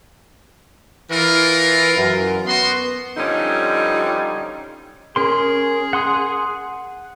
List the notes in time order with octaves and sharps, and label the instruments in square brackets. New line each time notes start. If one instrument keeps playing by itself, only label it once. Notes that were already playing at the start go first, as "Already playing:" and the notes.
[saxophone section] E3 [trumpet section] F4 A#4
[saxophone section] F#2
[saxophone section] B3 [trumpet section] F#4 C6
[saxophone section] D3 F3 G3 C#4 D#4
[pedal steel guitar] C#4 A#4 C6 [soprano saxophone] G#4
[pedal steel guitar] F#5 C6 D#6